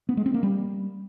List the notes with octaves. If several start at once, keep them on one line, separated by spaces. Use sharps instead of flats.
B3
G#3
C4
A#3
G3